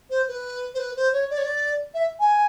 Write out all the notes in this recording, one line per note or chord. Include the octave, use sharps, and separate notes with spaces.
C5
B4
C5
B4
C5
C#5
D5
C#5
D5
E5
G#5